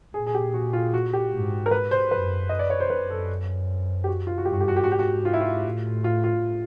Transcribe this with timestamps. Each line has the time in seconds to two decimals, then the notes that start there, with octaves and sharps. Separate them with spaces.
0.14 A#2 G#4
0.27 G#4
0.34 G4
0.54 F#4
0.73 F4
0.94 F#4
1.13 G4
1.33 G#2
1.66 A#4
1.71 B4
1.91 C5
2.11 F#2 B4
2.49 D#5
2.59 D5
2.70 C#5
2.80 C5
2.90 F#2 B4
3.10 A4
4.04 G4
4.08 F#4
4.27 F4
4.38 F#4
4.45 G2 G4
4.53 F#4
4.61 G4
4.68 F#4
4.76 G4
4.84 G#2 F#4
4.92 G4
4.99 F#4
5.25 F4
5.33 E4
5.41 F4
5.65 A2
6.04 F4
6.24 F4